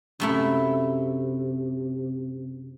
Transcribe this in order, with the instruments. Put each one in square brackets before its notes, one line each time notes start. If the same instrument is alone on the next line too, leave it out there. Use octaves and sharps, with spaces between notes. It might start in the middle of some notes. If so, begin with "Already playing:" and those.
[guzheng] F#2 A3 E4 [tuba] C3